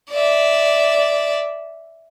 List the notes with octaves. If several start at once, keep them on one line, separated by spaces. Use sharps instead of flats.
D5 E5